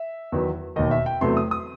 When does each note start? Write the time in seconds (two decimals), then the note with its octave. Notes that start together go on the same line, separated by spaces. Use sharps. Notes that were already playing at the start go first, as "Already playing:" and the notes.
Already playing: E5
0.32 E2 D#3 F#3 B3
0.76 E1 D#2 D#3 D#5
0.91 E5
1.06 G5
1.21 E2 C3 F#3 A3 C6
1.37 D#6
1.51 D#6